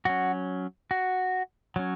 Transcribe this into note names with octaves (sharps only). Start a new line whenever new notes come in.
F#3 C#4 F#4
F#4
F#3 C#4